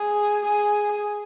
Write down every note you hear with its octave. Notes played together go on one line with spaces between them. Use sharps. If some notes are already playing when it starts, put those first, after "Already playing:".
Already playing: G#4
G#4